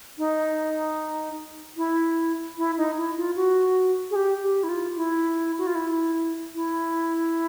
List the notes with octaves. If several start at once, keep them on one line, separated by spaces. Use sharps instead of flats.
D#4
E4
E4
D#4
E4
F4
F#4
G#4
G4
G4
E4
F4
E4
F#4
F4
E4
E4